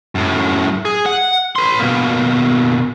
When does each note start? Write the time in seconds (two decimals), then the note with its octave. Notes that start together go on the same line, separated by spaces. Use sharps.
0.15 F#2 A2
0.85 G#4
1.06 F#5
1.56 B4 C6
1.80 B2 A#3